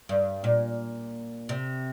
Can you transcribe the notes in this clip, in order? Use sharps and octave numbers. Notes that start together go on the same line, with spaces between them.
G2
A#2
C3